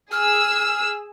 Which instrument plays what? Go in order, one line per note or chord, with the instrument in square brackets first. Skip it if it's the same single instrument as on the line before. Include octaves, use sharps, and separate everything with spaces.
[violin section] G#4 E6 [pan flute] F6